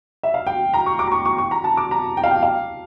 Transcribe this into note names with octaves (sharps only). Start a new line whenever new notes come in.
E5
F5
G5
A#5
C#6
D6
A#5
C#6
C#6
C#6
A#5
A5
D6
A#5
G5
F5
G5
F5